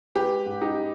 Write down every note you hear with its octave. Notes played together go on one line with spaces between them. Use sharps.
G#3 G4 B4
G#2
D#4 G4
G#3